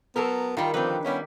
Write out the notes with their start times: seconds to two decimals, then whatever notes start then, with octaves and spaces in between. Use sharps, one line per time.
0.16 F#3 B3 A4 A#4
0.57 D#3 G3 F4
0.74 D3 F3 C4 B4
1.04 G3 B3 C#4 E4